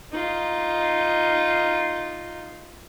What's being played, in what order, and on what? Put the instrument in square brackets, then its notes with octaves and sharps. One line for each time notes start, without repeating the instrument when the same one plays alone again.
[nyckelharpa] D#4 F4